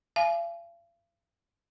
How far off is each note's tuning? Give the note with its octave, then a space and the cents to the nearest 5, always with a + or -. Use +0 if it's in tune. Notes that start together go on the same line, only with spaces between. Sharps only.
F5 -45 G#5 +30